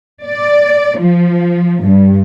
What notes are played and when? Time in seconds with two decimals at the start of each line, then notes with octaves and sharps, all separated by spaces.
0.24 D5
0.99 F3
1.83 G2